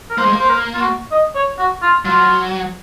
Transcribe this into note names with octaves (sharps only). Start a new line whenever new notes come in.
A#4
A#3 C5
G#3
A#3
C5
A#4
F4
F#4
D#5
C#5
F#4
F4
F#3 F4